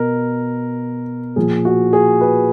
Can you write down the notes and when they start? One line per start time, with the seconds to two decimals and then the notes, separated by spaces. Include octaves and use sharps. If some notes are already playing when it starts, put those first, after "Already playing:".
Already playing: B2 A#4
1.36 A#2 F3 G#4
1.65 F#4
1.93 G#4
2.21 B4